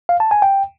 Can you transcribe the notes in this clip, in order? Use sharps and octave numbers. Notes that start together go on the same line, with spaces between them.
F5
A5
G#5
G5